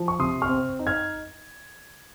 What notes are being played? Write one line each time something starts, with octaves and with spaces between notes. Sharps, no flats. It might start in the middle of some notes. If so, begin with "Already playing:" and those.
Already playing: F3
C#6
C3 C6 D#6
C#6 F6
C4
D#4
F6 G#6